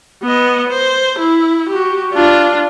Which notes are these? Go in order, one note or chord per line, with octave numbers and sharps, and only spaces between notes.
B3 D#5
C5
E4
F#4 G4
D4 F4